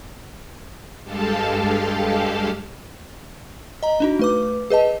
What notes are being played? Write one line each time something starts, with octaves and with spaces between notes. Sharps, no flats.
G2 G#3 G4 A4 F5 A5
D#5 A#5
D4 D#4 F#4
A3 B4 D6
G#4 B4 D#5 A5